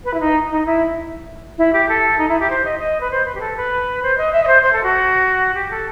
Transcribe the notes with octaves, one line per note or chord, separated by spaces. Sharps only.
B4
E4
D#4
D#4
E4
E4
G4
A4
D#4
E4
G4
C5
D#5
D#5
B4
C5
B4
G4
A4
B4
C5
D#5
E5
D#5
C5
C5
A4
F#4
G4
A4